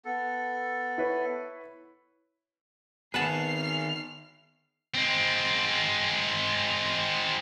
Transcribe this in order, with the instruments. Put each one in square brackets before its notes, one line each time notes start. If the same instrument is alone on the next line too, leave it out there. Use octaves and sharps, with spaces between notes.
[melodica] B3 A4
[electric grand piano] E4 B4 C#5
[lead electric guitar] D#3 G#4 [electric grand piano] B3 [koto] B4 F#5 A5 [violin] F6 C7
[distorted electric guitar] G#3 C4